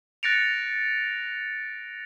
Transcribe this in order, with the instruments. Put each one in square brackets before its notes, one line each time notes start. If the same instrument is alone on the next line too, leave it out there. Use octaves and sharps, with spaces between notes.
[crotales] F#6 A6 A#6 C#7 D7 F7